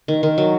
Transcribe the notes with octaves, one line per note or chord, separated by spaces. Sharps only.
D#3
D#3
F#3